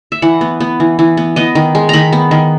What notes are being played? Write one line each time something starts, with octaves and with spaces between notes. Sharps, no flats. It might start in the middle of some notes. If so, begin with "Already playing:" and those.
E5
E3 F#5
B3
B3
E3
E3
B3
B3 D#5
D#3
G#3
D#3 A#5 B5
B3
D#3